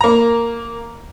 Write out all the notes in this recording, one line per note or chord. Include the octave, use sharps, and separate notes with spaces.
A#3 A#5